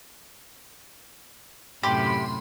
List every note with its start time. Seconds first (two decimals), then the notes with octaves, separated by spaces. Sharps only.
1.83 F#2 A2 C3 G4 B5 C6